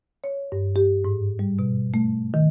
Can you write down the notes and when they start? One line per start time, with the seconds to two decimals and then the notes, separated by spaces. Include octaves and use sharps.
0.24 C#5
0.52 G2
0.76 G4
1.05 G#2
1.39 G3
1.59 B2
1.94 A3
2.34 D#3